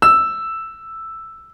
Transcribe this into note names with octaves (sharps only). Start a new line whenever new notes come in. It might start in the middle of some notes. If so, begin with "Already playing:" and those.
E6